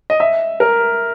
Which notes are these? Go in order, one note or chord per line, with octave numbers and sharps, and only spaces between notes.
D#5
E5
A#4